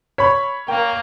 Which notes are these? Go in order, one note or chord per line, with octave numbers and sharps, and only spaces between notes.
C#5 B5 B6
A#3 G5